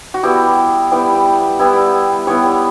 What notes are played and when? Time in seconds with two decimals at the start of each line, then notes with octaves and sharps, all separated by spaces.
0.14 F#4
0.23 G3 B3 E4 G4
0.91 G3 B3 E4
1.59 G3 B3 E4
2.27 G3 B3 E4 C#5